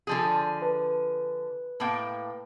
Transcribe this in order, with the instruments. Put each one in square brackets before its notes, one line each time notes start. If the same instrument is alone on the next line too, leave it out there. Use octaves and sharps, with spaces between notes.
[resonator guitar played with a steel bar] D3 F3 G#4
[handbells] B4
[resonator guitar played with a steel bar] A2 A#3 G5